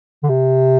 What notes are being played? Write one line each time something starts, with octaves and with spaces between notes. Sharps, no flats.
D3
C3